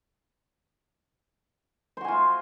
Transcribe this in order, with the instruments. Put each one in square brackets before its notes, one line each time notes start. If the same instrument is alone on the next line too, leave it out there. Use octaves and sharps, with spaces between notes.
[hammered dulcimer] C5
F#4
G#5
F4